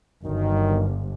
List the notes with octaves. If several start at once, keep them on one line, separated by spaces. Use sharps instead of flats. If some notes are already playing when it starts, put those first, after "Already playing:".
G1 F#2 D#3